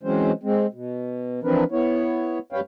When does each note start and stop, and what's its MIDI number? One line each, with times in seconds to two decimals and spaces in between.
0.03 0.31 52
0.03 0.31 54
0.03 0.31 56
0.03 0.31 60
0.03 0.31 61
0.03 0.31 72
0.43 0.66 56
0.43 0.66 60
0.74 1.40 47
1.43 1.64 52
1.43 1.64 53
1.43 1.64 60
1.43 1.64 62
1.43 1.64 70
1.43 1.64 71
1.72 2.39 59
1.72 2.39 64
1.72 2.39 73
2.52 2.60 42
2.52 2.60 55
2.52 2.60 71
2.52 2.60 73
2.52 2.60 77
2.52 2.60 79